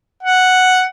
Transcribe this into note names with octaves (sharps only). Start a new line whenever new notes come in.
F#5